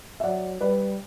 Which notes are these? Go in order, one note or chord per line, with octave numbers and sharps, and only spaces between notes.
E5
F#3 D5 F#5
G3 B4 D5